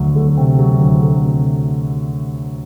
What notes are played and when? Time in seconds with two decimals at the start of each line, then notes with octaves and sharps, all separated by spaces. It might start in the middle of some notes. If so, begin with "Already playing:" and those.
Already playing: D2 F#3
0.16 A3
0.37 C3
0.59 F#3
0.81 D2
1.02 A3
1.24 C3